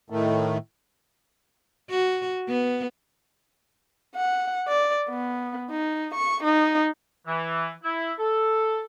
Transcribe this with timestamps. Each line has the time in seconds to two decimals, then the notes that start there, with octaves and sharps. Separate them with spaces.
0.10 A2 D#3 A3
1.90 F#4
2.49 B3
4.16 F#5
4.68 D5
5.09 B3
5.70 D#4
6.15 C#6
6.44 D#4
7.27 E3
7.83 E4
8.19 A4